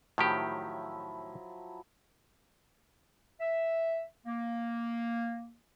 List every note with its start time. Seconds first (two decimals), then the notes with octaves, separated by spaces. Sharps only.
0.18 A2 D#3 F3 F#3 E4 G4
3.40 E5
4.25 A#3